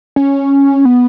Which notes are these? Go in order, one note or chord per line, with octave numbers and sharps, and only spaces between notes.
C#4
B3